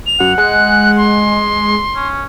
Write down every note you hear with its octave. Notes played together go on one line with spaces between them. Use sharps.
F7
F#2 F#5
G#3 F#6
C6
C#4